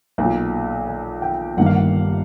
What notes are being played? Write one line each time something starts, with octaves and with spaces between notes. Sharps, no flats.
B1 A#2 F#3
G#5
G5
G1 G2 D#3 G3 A#3 F#5
F5
F#5